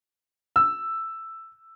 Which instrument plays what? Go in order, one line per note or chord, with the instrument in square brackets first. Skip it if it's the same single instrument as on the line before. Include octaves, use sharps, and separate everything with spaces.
[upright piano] E6